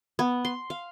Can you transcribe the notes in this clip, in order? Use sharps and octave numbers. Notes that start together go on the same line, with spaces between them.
B3
C6
F5